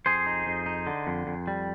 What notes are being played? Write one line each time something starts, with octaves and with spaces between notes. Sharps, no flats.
F2 G#4 C5
D#4
F2
D#4
D3
F2
F2
G3